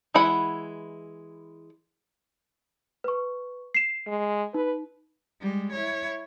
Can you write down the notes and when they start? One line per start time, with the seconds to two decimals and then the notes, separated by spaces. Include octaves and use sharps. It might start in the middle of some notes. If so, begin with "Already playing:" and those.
0.14 E3 G#3 E4 F#5 B5
3.04 B4 C#6
3.75 C7 E7
4.07 G#3
4.54 D#4 B4
5.41 G3 G#3
5.72 E4 C#5